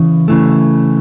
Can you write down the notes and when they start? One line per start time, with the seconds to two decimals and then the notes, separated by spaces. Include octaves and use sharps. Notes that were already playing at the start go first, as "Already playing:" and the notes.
Already playing: C#3 E3
0.28 C#3 E3 A3